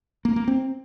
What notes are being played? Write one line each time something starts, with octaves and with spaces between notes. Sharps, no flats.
A#3
A#3
C4